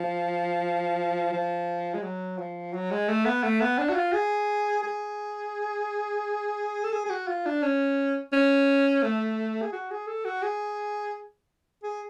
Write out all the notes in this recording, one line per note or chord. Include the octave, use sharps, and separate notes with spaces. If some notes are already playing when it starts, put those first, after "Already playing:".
Already playing: F3
F3
G#3
F#3
F3
F#3
G#3
A3
B3
A3
B3
D4
F#4
F4
G#4
G#4
A4
G#4
G#4
F#4
F4
D4
C#4
C#4
A3
G#4
F#4
G#4
A4
F#4
G#4
G#4